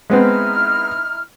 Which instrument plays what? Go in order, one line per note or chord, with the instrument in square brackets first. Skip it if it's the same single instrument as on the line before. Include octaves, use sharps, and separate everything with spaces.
[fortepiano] G#3 B3 C4 [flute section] D#4 E4 F6